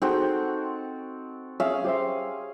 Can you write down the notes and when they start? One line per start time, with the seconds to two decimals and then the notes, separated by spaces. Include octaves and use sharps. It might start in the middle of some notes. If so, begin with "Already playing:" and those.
0.02 C4 D#4 F#4 G#4 A4
1.60 C#4 G#4 E5 F5
1.84 G4 C5 E5